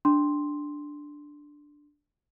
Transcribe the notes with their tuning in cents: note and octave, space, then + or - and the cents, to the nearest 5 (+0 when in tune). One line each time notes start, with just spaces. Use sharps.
D4 +0 C6 +0